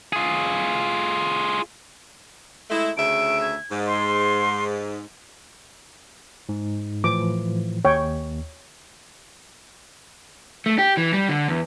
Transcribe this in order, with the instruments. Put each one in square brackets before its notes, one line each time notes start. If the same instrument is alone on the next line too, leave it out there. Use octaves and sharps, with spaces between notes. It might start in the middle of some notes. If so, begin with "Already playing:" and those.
[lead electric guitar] F4 G#4
[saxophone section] G#3 A3 E4
[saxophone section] D2 C#3 E5 [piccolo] D7
[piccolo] G#6
[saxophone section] G#2
[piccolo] C6
[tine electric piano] G#2
[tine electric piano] A2 E3 F3 [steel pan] D6
[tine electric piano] D#2 [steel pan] C#5 G5
[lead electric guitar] A3
G4
E3
G3
D3
E2